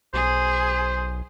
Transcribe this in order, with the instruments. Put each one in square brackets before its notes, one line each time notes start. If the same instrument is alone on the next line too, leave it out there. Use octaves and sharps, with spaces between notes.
[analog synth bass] B1 [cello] G#4 [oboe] C5